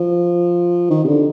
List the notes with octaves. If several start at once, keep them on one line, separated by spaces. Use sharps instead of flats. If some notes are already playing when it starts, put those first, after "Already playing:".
Already playing: F3
D#3
C3
D3